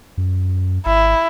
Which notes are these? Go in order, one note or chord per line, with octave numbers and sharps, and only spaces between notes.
F#2
G#1 E4